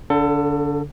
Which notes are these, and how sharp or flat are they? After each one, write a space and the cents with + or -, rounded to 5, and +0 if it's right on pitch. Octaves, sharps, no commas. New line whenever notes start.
D3 -30 A4 +25